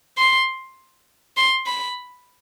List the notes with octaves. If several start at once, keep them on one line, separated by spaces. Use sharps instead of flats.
C6
C6
B5